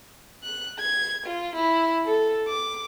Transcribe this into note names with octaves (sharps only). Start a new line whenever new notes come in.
F#6
G#6
F4
E4
A4
D6